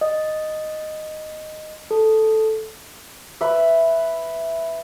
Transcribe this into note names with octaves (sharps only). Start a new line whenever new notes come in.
D#5
A4
B4 E5